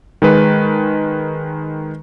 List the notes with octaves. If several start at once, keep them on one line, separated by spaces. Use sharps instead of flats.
D#3 G#3 B4